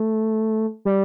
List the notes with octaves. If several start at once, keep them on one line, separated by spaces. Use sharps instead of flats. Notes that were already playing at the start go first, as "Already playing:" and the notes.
Already playing: A3
G3